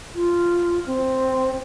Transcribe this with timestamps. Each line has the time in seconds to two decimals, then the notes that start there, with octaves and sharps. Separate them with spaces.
0.15 F4
0.86 C4